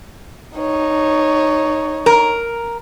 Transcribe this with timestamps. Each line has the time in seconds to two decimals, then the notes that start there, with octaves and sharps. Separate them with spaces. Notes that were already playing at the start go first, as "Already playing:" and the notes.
0.57 D#4 C#5
2.06 A#4